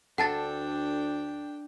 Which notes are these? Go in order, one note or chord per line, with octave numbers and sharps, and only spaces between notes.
D2 D4 A4 F#5 G5 A5 A6